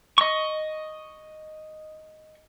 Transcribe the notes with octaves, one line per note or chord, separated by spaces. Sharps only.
D#5 C#6